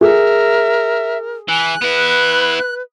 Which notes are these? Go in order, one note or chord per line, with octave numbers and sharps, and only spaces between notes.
G#4 A#4 E5
E3 G#5 F#6
B3 E4 B4